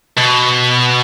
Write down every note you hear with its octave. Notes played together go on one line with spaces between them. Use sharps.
B2